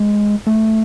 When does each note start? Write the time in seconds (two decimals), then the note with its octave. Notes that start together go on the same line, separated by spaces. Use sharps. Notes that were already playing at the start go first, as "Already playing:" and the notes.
Already playing: G#3
0.47 A3